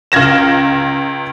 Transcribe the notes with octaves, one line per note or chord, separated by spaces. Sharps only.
C#2 F6 G#6 A#6 E7